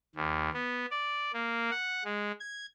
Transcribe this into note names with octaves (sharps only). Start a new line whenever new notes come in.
D#2
B3
D5
A#3
F#5
G#3
G#6